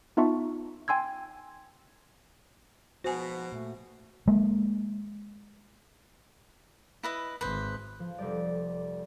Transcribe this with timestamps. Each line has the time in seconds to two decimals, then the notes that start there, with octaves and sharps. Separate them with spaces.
0.17 B3 D#4 F4 E5 A5 C#6
0.88 G5 G#5 C6 E6 G#6
3.04 G#2 B2 F3 F#4 C5 G#5
3.52 A#2 A3
4.28 G#3 A#3
7.03 E4 B4 D#5
7.41 G#1 B4 C5
8.00 F3
8.18 F1 G3 D5